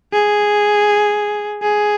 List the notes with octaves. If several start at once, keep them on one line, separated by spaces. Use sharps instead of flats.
G#4
G#4